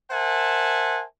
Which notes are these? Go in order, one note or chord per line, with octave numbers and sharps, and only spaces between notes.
A#4 C5 E5 F#5 G#5 A5